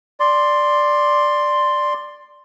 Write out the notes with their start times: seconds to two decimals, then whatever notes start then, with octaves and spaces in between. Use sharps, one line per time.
0.20 D5 C6